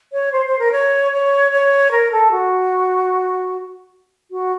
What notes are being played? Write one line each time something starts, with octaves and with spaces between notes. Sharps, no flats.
C#5
C5
C5
A#4
C#5
C#5
C#5
A#4
A4
F#4
F#4